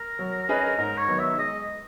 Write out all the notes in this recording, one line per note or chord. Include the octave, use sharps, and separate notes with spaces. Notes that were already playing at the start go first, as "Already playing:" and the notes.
Already playing: A#4
F#3
C#4 G#4 B4 D#5
G#2 A#4
C#5
D#3 F#3 B3
E5
G#3 D#5